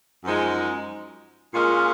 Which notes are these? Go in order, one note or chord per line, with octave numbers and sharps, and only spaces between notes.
F#2 F3 G#3 D#4
A#2 G#3 C#4 F4 A#4